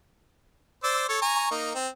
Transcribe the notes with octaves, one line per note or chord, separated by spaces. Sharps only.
C5 D5 E6
A4 C#5
G#5 A#5 C#6
A#3 D#4
C4